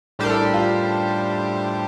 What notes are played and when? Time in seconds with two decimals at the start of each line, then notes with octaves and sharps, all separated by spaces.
0.19 A2 G3 D4 G4 A#4 C5
0.30 A4
0.42 A4
0.54 F4